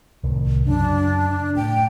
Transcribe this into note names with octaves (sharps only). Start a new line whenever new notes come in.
C2 A2 D#3
F#2 C#3 F#3 D4
A2 G5